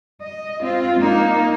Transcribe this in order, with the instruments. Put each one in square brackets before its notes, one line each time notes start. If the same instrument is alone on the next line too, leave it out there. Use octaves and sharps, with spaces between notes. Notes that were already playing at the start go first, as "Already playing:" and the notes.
[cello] D#5
C4 F4
A#3 D#4